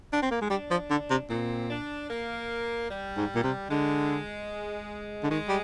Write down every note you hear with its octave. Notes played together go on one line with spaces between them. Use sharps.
D4
C4
A#3
G#3
G3 D4
F3
D3
C3
A#2 C4
D4
A#3
G3
G#2
A#2
C3
D3 G#3
D3
D#3 G#3
G3